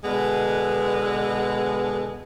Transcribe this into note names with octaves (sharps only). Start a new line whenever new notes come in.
B2 D3 G#3 B3